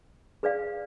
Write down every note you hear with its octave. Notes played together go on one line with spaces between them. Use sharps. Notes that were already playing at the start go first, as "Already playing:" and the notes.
G#4 B4 D5 F5